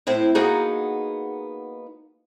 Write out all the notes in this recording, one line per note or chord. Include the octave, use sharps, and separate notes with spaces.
A2 C4 E4
A#3 B3 D#4 F#4 G#4